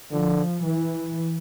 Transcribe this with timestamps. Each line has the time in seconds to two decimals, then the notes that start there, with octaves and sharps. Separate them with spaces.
0.11 D3 F3
0.63 E3